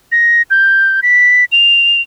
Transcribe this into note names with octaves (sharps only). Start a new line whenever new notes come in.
A#6
G6
B6
F7